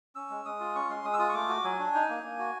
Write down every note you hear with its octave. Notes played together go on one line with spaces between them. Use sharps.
C#4 E6
G#3
G#3 D#6
F4
C#4 C#6
G#3 C6
G#3 D#6
E6
F4 D#6
C#6
A3 D6
F#4
F#3 G#5
D4
D#4
A#3
A#3
F#4